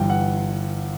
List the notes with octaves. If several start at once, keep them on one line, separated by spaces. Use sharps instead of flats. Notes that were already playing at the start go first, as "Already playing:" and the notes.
Already playing: G1 G2 E3 G5
F#5